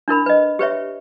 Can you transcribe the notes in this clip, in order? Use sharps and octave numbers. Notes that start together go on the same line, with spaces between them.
D4 E4 A#4 B5
B4 D#5
G4 B4 C#5 E5